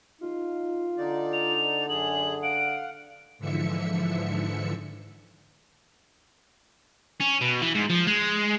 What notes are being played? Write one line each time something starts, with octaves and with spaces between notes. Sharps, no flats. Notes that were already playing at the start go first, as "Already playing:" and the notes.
D#4 F4
D3 D#4 D5
F7
F#2 G#4 F#7
F5 F#5 D7
G#2 D3 E3 F3 E5 C#7
C#4
B2
E3
G#2
F3
G#3